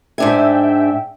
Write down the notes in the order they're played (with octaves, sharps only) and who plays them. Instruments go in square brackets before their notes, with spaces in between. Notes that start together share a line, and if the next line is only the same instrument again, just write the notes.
[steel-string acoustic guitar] G#2 D4 G#5 [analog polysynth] E5 G5